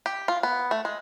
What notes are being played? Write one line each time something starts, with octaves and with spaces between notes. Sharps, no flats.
G4
F4
B3
A3
G#3